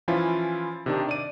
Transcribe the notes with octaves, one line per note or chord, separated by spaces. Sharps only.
E3 F3 C#4 E4 F4
C3 D#3 D4
D5 D#7